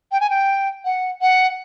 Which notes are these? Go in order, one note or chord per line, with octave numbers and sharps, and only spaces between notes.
G5
G#5
G5
F#5
F#5